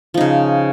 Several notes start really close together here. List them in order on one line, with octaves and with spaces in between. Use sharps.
F3 D#4 C#3